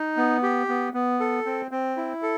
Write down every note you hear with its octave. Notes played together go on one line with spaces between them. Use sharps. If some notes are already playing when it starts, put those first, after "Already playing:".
Already playing: D#4
B3
G4
B3
B3
A4
C4
C4
E4
A4